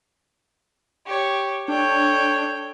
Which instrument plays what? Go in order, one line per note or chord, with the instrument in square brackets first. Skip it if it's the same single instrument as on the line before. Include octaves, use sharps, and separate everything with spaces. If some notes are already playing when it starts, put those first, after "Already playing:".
[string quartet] G4 C#5
[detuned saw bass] D4 [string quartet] A4 C#5 G5